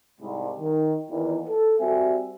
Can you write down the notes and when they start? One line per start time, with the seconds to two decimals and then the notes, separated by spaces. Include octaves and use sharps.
0.20 C2 G#2
0.60 D#3
1.10 E2 A#2 D#3 E3
1.48 A4
1.80 G3 C4 F#4 E5 G#5